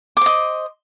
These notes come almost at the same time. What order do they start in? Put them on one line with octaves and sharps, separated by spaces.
D6 C5 D#5